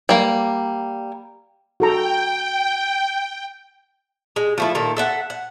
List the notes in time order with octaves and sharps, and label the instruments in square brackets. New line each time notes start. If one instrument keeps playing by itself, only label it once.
[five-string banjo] G3 A#3
[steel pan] F#4 A4 A#5 [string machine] G5
[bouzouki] G#3
F3 A3 E4
A#2 D#3 A4 A#4
A4 E5 F#5
F#5